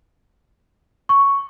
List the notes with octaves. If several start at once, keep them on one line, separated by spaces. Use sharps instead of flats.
C#6